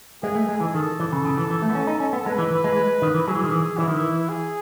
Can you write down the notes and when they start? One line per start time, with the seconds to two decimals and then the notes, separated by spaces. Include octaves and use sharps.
0.23 G#3 G#4
0.35 A3
0.49 G#3
0.60 E3
0.74 D#3 A4
1.00 E3
1.12 C#3
1.25 C#3
1.38 E3
1.50 E3
1.62 A3
1.70 B3
1.75 C#4
1.87 D#4
2.00 C#4
2.13 B3
2.26 G#3 B4
2.38 E3
2.51 E3
2.64 G#3
2.76 G#3
3.02 D#3
3.14 E3
3.28 F#3 G#4
3.35 E3
3.44 D#3
3.51 E3
3.78 E3 E4
3.88 D#3
3.99 E3
4.29 G#4